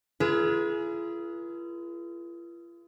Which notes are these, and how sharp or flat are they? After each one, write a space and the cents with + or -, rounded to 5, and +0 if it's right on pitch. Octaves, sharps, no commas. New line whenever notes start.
F4 -45 G#4 +20 B4 -40